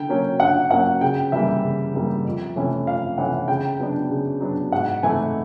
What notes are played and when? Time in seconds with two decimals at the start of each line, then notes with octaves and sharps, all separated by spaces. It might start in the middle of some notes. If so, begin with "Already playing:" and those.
Already playing: D3 G5
0.09 F#3 A#3 C#4
0.40 D3 F#5
0.71 F#3 A#3 C#4 F#5
1.01 C#3 G5
1.32 E3 G3 A#3 E5
1.64 C#3
1.94 E3 G3 A#3
2.25 F2
2.56 C3 E3 A3 C#4
2.86 F2 F5
3.18 C3 E3 A3 C#4 F#5
3.48 C#3 G5
3.79 F#3 B3 D4
4.10 C#3
4.40 F#3 B3 D4
4.72 G#2 F#5
5.03 E3 A3 C4 D#4 G#5